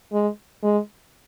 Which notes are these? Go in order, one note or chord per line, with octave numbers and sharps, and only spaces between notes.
G#3
G#3